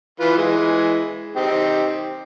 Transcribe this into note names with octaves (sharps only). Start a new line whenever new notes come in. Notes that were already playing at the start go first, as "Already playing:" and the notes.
E3 F4 B4
E3 G#3
C4 D#4 G4